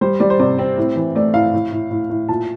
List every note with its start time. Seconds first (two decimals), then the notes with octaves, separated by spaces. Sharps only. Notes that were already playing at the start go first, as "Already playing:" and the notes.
0.01 G3 C5
0.20 G3 D5
0.30 C5
0.39 C3 D5
0.59 C4
0.77 A2
0.96 E3
1.15 A3 D5
1.34 A2 F5
1.53 A2
1.72 A2
1.91 A2
2.10 A2
2.29 A#2 A5